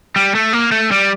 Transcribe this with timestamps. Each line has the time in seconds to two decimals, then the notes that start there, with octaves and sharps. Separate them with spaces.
0.16 G3
0.35 A3
0.53 A#3
0.72 A3
0.91 G3